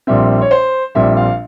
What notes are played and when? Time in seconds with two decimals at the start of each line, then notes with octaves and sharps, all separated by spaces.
0.07 A#1 A#2 G3 C4 E5
0.42 C#5
0.51 C5
0.95 A#1 A#2 G3 C4 E5
1.17 F5